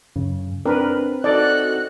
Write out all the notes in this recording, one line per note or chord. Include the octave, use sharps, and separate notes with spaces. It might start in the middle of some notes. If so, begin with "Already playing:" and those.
F#2 C#3
C4 D4 A#4 B4
D#4 F#4 A4 D5 D#5 F#6